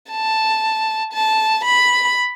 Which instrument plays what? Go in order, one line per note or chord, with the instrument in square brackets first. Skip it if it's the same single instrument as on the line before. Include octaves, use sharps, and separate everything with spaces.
[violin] A5
A5
B5